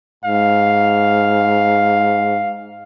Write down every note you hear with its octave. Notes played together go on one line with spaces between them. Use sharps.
G#2 F5